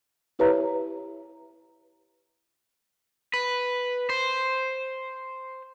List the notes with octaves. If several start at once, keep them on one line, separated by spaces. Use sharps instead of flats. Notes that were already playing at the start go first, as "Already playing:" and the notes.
E4 G4 B4 C#5 E5 A#5
B4
C5